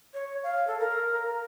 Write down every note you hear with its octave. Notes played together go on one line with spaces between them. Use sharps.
C#5
F5
A4
A#4